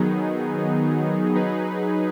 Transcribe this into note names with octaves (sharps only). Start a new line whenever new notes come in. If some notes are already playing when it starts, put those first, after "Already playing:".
Already playing: D#3 F#3 B3 D#4 G#4
F#3 D#4 G#4 B4